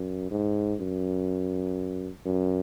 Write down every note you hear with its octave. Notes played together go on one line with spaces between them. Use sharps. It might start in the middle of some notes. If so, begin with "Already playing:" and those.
Already playing: F#2
G#2
F#2
F#2